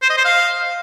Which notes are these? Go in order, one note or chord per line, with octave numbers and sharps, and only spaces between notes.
C5
D#5
C5
F5